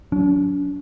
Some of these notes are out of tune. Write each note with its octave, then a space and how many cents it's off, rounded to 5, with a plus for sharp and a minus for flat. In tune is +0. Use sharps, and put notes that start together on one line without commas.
F#3 +0 D4 -45